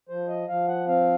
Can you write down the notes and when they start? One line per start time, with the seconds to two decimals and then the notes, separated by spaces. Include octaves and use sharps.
0.09 F3 C5
0.28 D#5
0.48 F3 F5
0.68 F#5
0.87 C4 F5